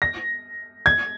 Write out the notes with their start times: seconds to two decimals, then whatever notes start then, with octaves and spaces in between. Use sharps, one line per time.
0.02 A#6
0.86 G#6